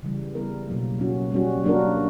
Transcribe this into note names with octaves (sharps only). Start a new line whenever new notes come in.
C#3 E3 G3
G3 B3 E4 A#4
B2 F#3 A#3
F#3 C#4 F#4
G3 C#4 F#4
F#3 A#3 D4 F#4 A#4